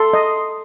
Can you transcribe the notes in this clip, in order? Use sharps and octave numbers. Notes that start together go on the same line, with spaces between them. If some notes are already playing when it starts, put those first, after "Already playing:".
Already playing: A4 C6
D#5